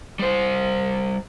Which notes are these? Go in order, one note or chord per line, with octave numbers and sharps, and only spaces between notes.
G3 C5